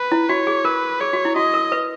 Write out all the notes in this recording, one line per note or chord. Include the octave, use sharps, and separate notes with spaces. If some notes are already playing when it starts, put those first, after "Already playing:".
Already playing: B4
E4
F#4 C#5
G#4
A#4 B4
G#4 C#5
F#4
E4
F#4 D#5
A#4
B4